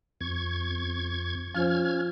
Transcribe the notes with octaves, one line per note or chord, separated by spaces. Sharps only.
F2 C#6 G#6
F3 C#4 F4 C5 F6 G#6